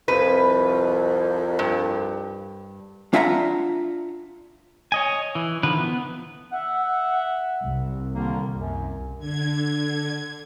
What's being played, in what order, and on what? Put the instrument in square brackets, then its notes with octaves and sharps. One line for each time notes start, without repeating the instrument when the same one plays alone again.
[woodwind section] C2 F2 [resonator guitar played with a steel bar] B4
[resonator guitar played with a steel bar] G2
[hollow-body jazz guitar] D4 F4 E5 F#5 G#5 A#5
[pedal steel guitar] C#5 D#5 G#5
E3
D3 D#3 F3 B4
B3
[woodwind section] E5 F#5
[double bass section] C2
[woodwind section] D3 D#3 A#3
F#2
[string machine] D3 G#6